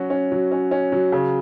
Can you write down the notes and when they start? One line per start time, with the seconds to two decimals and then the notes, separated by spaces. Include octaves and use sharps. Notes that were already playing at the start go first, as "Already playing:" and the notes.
Already playing: F#3 C#4 F#4
0.10 C#4
0.32 F#3
0.52 C#4
0.71 C#4
0.92 F#3
1.12 C#3